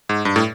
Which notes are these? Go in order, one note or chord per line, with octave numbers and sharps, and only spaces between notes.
G#2
G2
A2